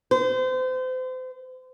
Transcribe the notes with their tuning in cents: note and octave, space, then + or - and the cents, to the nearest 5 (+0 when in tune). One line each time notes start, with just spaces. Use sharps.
C5 -35